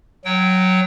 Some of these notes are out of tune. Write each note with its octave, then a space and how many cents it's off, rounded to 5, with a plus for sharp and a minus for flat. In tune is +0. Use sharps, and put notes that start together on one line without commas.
F#3 +0 G5 -20